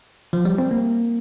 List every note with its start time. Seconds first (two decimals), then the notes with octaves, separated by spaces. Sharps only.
0.33 F3
0.45 G3
0.58 C4
0.71 A#3